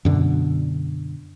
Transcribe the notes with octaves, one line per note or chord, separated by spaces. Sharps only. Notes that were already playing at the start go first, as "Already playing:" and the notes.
F#2 B2 D3